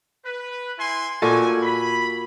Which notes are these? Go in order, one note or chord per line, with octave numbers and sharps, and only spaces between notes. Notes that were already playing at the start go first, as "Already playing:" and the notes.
B4
E4 G#5 C6
A#2 F3 D#4 F#4 A4 G#5
B5